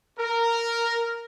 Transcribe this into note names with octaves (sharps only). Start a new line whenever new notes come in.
A#4